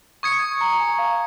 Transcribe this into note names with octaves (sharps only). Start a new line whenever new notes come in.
C#6 D#6 G#6 C#7
A#5
G#5
F5